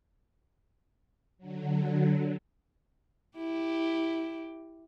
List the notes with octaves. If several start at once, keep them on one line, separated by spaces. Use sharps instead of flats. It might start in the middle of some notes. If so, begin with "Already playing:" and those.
D3 F#3
E4 G4